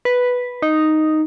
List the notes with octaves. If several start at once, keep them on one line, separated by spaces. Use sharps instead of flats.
B4
D#4